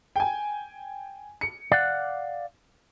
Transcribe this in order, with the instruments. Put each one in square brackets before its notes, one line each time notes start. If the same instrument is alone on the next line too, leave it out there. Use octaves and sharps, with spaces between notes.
[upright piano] G5 G#5
C#7
[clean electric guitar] D5 F5 F#5